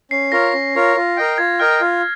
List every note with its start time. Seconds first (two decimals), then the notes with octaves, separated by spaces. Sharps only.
0.11 C#4 C7
0.32 F4 A#4 C#5 A#6
0.54 C#4
0.75 F4 A#4 C#5
0.96 F4
1.16 A#4 D#5 G5
1.38 F4 G#6
1.60 A#4 D#5 G5 F6
1.81 F4